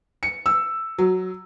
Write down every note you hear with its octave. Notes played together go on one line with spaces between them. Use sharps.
C#7
E6
F#3